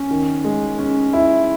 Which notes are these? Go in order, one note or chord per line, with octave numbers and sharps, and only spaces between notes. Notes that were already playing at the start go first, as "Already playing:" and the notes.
Already playing: C#4
D#3
G#3
C#4
E4